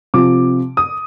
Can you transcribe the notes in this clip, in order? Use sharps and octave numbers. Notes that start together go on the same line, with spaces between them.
C3 F3 D6
D#6